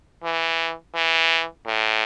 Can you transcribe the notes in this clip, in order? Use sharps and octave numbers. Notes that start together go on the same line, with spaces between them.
E3
E3
A2